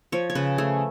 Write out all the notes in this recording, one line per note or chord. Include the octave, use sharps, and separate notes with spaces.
F3 C#5
C#5
C#3 B4
A3 G#4